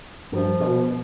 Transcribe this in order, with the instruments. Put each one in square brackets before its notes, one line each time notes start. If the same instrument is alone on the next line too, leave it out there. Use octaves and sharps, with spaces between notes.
[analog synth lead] G2 [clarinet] F3
[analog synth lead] B2